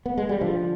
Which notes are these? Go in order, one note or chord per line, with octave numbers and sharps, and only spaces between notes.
B3
G#3
G3
D3 F3